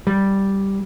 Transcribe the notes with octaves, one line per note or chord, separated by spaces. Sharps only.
G3